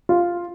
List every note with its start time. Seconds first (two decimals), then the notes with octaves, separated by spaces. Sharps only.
0.09 F4